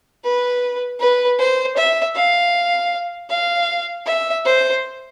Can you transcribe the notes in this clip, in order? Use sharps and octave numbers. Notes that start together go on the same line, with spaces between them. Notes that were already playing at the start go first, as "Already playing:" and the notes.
B4
B4
C5
E5
F5
F5
E5
C5